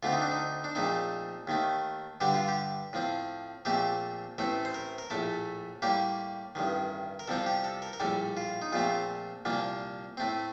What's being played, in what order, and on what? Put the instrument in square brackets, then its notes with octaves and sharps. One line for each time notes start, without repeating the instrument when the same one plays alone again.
[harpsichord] D2 D3 A3 C4 F4
D#4
D4
D#4
D4
A#1 A#2 A3 C4 D#4
D#2 D#3 A3
G2 D3 G3 G4
F4
G4
A2 F3 C4
A#1 A#2 A3 C4 G4
A1 A2 A3 C4 A4
C5
A#4
A#4
A#1 A2 A3 A4
A2 G3 A#3 G4
A1 G2 D#3
A#4
C2 C3 F3 C4 A4
G4
A4
A#4
A#4
A#1 A2 G3 A4
F4
D#4
A#1 A#2 A3 C4 F4
C2 A#2 F3 A#3
A2 A3 C4